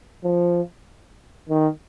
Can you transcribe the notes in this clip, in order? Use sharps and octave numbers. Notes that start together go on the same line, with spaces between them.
F3
D#3